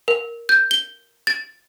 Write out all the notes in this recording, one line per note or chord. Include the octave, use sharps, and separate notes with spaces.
A#4
G6
G7
A6